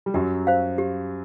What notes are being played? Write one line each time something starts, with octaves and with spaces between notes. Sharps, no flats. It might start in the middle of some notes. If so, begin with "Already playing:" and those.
G3
F#2 F#3 G4
C5 F5
G4